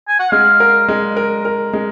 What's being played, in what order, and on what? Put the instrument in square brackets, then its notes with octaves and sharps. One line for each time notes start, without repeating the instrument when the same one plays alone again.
[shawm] G#5
F#5
[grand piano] G#3 [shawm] F5
[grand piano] A#4
G#3
A#4
A#4
G#3